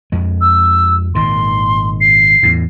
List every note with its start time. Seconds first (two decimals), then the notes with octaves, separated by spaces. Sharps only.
0.12 F2 G#3
0.41 E6
1.15 G#1 A#2 D#3 C6
2.01 C7
2.43 E2 A2